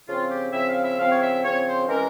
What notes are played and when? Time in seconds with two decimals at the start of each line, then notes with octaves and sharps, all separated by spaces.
0.07 C#3 F3 C4 F4
0.30 G4
0.52 C#3 F3 C4 E5
0.68 F5
0.83 E5
0.98 C#3 F3 C4 F5
1.10 C#5
1.20 E5
1.43 C#3 F3 C4 C#5
1.65 C5
1.88 E3 G#3 C#4 A#4